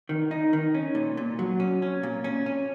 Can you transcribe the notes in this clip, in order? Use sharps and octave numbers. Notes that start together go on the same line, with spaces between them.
D#3
D#4
D#3
C#4
A#2
A#2
F#3
C#4
C#4
A#2
C#4
C#4